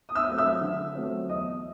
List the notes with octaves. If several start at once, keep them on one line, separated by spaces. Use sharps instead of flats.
D#6
E5 E6
F#3 A3 C4
E5 E6
D3
F#3 A3 C4
E2 D#5 D#6